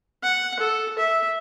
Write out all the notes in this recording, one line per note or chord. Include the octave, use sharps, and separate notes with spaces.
F#5
A4
E5